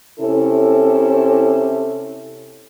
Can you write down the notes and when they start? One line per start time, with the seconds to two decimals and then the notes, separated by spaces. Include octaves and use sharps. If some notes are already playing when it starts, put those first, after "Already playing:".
0.20 C3 C#4 E4 A4